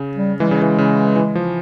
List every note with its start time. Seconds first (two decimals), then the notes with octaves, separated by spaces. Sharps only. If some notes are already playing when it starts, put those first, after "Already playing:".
Already playing: C#3
0.16 G3
0.40 E3 G#3
0.47 G3
0.51 C#3 G#3
0.62 E3
0.78 C#3
1.16 E3
1.35 F3